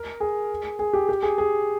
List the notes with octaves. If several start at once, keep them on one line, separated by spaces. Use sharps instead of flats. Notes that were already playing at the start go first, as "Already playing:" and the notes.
Already playing: A#4
G#4
G#4
G4
G4
G#4
G#4